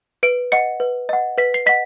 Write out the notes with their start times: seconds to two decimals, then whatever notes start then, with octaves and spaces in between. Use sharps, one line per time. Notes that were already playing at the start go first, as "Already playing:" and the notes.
0.23 B4 D7
0.52 D#5 F#5 C#7
0.80 B4
1.09 D#5 F#5
1.38 B4 B6
1.54 C7
1.66 D#5 F#5 B6